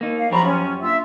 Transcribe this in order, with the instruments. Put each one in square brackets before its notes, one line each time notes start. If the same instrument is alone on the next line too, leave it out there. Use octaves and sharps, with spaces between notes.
[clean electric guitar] A#3 D#4
[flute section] F5
[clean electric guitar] F#2 G4 C#5 [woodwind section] F3 F4 [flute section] A#5 B5
[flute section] C#4
[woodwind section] A#3 D4 F4 [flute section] E5 E6